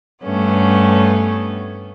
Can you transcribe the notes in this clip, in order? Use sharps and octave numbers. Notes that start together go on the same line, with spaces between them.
G2 A3 B3 C#4